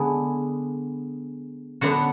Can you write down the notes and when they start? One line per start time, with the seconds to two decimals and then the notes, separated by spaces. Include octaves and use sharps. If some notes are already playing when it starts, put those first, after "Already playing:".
Already playing: D3 G#3 B3 D4 G#4
1.81 D3 F#3 B3 D4 F#4 F#5